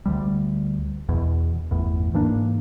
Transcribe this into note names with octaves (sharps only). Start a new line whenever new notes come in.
D2 G3
E2 B2
G1 E2 A2
G#2 E3 A#3 D4